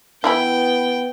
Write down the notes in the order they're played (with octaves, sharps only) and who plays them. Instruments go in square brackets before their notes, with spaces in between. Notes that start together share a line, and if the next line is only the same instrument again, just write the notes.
[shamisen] E3 E4 B5 [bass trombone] B3 [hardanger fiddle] G5